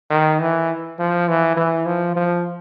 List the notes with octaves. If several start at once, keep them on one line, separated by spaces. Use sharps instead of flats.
D#3
E3
F3
E3
E3
F3
F3